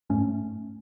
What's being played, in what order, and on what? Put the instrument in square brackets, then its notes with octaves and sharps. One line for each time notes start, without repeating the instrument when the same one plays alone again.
[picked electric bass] G#2 A3 C#4